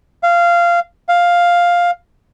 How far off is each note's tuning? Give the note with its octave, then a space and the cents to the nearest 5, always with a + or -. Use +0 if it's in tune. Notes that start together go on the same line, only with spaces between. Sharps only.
F5 -15
F5 +5